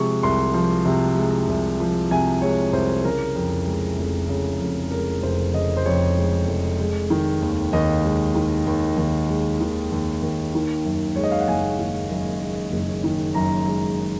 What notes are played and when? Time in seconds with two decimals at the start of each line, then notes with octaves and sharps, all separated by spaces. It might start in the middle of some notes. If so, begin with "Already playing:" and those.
Already playing: C3 F3 G#3 C#6
0.23 C2 C6
0.54 F3
0.85 C3
1.17 G#3
1.48 C2
1.80 F3
2.11 C3 G#5
2.42 G#3 C#5
2.73 C2 C5
3.05 C#3 A#4
3.36 F2
3.67 G#3
3.98 F1
4.29 C#3
4.60 F2
4.91 G#3 A#4
5.23 F1 C5
5.54 C#3 D#5
5.77 C5
5.86 F2 C#5
6.17 G#3
6.48 F1
6.79 G#3
7.10 D#3
7.42 D#2
7.73 D#2 D#5
8.05 G#3
8.35 D#3
8.66 D#2
8.98 D#2
9.29 G#3
9.61 D#3
9.92 D#2
10.22 D#2
10.55 D#3
10.85 F#2
11.16 G#3 C#5
11.23 D#5
11.32 F5
11.40 F#5
11.48 F#1 G#5
11.79 D#3
12.10 F#2
12.42 G#3
12.72 F#1
13.04 D#3
13.35 F#2 A#5
13.67 G#3